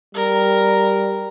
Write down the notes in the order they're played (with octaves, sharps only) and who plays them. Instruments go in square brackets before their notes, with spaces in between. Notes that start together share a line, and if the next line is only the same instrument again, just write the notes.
[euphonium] G3 [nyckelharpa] A#4